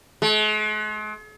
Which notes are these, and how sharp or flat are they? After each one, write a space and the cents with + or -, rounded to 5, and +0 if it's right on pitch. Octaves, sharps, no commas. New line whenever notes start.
G#3 +45